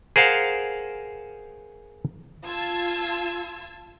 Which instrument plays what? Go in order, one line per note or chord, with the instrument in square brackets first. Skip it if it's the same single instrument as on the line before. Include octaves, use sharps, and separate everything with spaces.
[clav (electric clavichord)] G#4 A#4 C5 F5 F#5
[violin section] F4 A5 E6 G#6